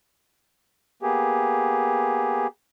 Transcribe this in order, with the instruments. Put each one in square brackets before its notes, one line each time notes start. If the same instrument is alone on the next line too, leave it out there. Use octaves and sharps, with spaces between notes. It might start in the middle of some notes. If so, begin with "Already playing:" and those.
[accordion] A#3 B3 G4 G#4